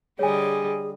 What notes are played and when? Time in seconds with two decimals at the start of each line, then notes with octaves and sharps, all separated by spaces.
0.19 D3 G3 G#4 C#5 D#5 G#5